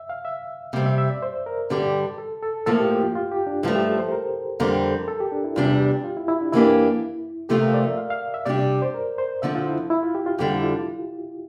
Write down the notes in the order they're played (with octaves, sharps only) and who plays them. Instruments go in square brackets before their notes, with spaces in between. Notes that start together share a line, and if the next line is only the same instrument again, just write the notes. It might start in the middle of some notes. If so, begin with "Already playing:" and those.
Already playing: [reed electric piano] E5
F5
E5
[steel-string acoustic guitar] C3 G3 C4 [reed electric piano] F5
[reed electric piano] E5
E5
D5
C5
A#4
[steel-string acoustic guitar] G2 D3 G3 D4 G4
[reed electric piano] A4
A4
[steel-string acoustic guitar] A2 F3 A#3 [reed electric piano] A4
[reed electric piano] G4
G4
F4
F4
G4
D4
[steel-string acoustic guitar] G2 F3 A3 [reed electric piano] E4
[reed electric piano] G4
A4
C5
A#4
[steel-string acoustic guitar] F2 D3 G3 C4 [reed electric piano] A#4
[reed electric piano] A4
G4
D4
E4
[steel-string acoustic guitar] E2 C3 G3 D4 [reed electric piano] F4
[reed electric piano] G4
F4
E4
E4
D4
[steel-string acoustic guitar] F2 E3 A#3 D4 G4 [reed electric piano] E4
[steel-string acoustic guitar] C3 F3 A3 C4 F4 [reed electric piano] G4
[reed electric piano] A#4
D5
E5
F5
F5
E5
[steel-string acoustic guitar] C3 G3 D4 G4 [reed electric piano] D5
[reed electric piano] D5
C5
A#4
C5
[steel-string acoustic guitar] D3 F3 C4 [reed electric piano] E5
[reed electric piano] F4
E4
E4
F4
G4
F4
[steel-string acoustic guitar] F2 D3 G3 D4 [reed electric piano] G4
[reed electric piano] E4
F4